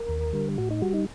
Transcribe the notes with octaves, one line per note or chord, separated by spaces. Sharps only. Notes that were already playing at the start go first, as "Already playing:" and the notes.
Already playing: A#4
D#2
D3 G3
A2 F#4
D#4
G3 F#4
D#4